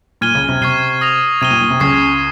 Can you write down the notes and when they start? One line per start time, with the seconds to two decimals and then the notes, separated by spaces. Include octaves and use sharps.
0.21 A#2 F6 G#6 D#7 G7
0.35 C#2 C#3
0.49 C3
0.61 C3 C#6 G#6 C7 D#7 G7
1.01 D#6 A#6 F7
1.41 C3 G#6 D#7 G7
1.50 A#2
1.61 A#2
1.70 C3
1.80 C#2 C#3 C#6 G#6 C7